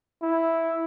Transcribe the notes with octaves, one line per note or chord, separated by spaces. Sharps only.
E4